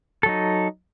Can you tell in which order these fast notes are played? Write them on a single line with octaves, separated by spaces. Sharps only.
A4 F#3 D#4